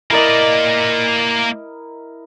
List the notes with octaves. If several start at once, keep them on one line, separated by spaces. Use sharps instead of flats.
A#3 E4 A#4 D5 D#5